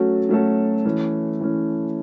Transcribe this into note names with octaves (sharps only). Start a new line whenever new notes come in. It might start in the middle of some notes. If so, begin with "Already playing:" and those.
Already playing: F#3 A3 C#4 F#4 A4
F#3 A3 C#4 F#4 A4
E3 A3 C#4
E3 A3 C#4